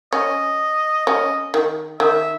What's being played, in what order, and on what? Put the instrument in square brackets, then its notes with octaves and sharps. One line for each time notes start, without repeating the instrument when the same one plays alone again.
[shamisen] C#4 [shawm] D#5
[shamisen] C#4 [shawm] D#5
[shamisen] D#3
[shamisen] D#3 [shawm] E5